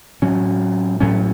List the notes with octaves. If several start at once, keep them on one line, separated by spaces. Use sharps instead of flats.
A2 F#3 C#4
A2 F#3 C#4